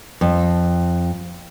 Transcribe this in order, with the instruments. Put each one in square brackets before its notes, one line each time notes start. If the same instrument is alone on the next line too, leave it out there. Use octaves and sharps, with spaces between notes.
[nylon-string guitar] F2